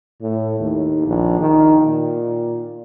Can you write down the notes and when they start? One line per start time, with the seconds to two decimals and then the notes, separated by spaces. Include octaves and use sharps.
0.22 A2
0.60 D#2
1.06 A#1
1.39 D#3
1.87 A#2